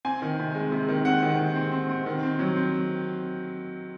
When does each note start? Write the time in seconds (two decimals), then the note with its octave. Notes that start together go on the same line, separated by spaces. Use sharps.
0.05 C4 G#5
0.22 D#3
0.39 C3
0.55 G#3
0.72 C3
0.89 D#3
1.05 C4 F#5
1.23 D#3
1.39 D#3
1.56 C4
1.72 C4
1.89 C4
2.06 D#3
2.23 C4
2.39 F#3
2.56 C4